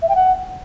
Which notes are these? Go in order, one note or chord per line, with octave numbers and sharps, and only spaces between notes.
E5
G5
F#5